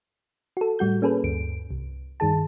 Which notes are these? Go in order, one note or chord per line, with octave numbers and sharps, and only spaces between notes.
F#4 A4
A2 G3 F#4 G6
A#3 C#4 G#4 A4 B4
D2 G2 D7
C2
G2 D#3 G#4 A5